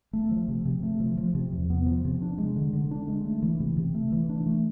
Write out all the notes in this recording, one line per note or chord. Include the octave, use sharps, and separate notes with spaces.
A3
F3
C3
C3
A3
F3
F3
C3
E2
B3
F3
C3
D4
G#3
D3
D3
D4
G#3
A3
E3
C3
C3
A3
E3
D4
A3